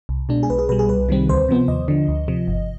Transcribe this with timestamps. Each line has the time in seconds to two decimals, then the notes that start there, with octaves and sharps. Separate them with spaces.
0.09 C2
0.29 B2 G#3 D4
0.43 G#4
0.50 B1 B4
0.59 G#4
0.69 B2 G3 B4
0.79 G#4
0.89 C2 B4
1.09 C3 D#3 G3 C4
1.29 D2 C5
1.48 C3 F3 B3
1.68 D#2 D#5
1.88 D3 F3
2.08 D2
2.28 C3 F3
2.48 G1